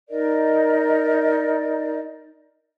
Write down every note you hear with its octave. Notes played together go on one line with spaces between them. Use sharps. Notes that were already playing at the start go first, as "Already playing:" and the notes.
D#4 A#4 D5 D#5